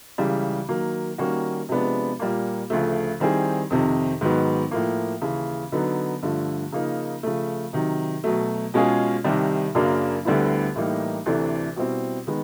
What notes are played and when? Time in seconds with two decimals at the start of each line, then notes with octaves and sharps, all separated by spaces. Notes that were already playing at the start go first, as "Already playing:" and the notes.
0.18 C#2 C#3 E3 G3
0.69 D#3 F#3 A#3
1.18 D#3 G3 A#3 C#4 F#4
1.69 C3 F3 G#3 B3 D4
2.19 A#2 G3 A#3
2.70 D2 C#3 F3 A3
3.20 D#3 G3 C4 E4 G#4
3.70 F2 C3 D#3
4.21 G#2 D#3 F#3 B3
4.71 A2 F3 A#3
5.22 D#2 C#3 E3
5.72 D3 F#3 B3 D#4
6.23 G2 D3 F3 A3
6.72 C#3 F3 A#3 D#4
7.23 C#3 F3 A3
7.73 C3 D#3 F#3
8.24 B2 F#3 A3
8.74 B2 G#3 C#4 F4 G#4
9.24 C2 C3 D#3 G3
9.75 F#2 C#3 F#3 A#3 D4
10.25 D2 D3 G3 B3 E4
10.75 A2 E3 G3 A#3 D#4
11.26 D2 C3 E3 A3 D4
11.76 B2 G3 C4 E4
12.27 D#3 G#3 B3